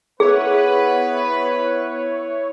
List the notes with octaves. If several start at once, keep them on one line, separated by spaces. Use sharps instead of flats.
B3 E4 G#4 B4 C#5